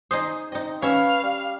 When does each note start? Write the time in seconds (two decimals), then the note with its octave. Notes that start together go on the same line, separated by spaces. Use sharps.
0.11 D#4 G#4 C5 D#6
0.52 C4 D#4 D#5
0.82 C#4 B4 E5 F5
1.23 G3